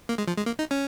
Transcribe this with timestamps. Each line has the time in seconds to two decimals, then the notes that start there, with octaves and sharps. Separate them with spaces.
0.09 A#3
0.18 G#3
0.28 F3
0.37 G#3
0.46 A#3
0.59 D#4
0.71 C#4